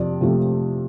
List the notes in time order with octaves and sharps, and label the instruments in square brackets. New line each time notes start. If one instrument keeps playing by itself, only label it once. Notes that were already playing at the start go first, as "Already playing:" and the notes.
Already playing: [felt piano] F2 C3 F3 D5
C3 F3 A3